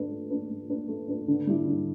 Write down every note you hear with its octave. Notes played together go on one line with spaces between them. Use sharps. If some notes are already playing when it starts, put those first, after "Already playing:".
Already playing: A3 D4 B4
A3
D4 B4
A3
D4 B4
A3
D4 B4
D3
G3 E4
D3